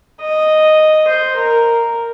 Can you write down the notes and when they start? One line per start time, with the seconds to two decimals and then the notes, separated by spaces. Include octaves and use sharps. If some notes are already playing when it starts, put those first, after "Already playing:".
0.21 D#5
1.08 C5
1.36 A#4